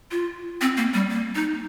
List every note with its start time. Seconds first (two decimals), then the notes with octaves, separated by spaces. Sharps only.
0.11 F4
0.61 C4
0.77 A#3
0.94 G3
1.10 A#3
1.35 D#4